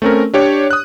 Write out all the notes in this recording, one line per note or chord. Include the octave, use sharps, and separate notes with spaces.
A3 C4 C#4 A#4
D4 G4 C#5 D5
D#6 F#6